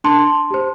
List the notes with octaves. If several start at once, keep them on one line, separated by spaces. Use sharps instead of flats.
D4 A5 C6
G4 C5